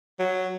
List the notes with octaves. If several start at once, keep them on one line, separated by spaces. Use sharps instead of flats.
F#3